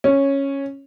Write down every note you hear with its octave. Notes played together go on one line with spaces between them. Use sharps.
C#4